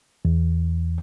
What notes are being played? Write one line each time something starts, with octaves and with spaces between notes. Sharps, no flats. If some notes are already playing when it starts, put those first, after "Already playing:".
E2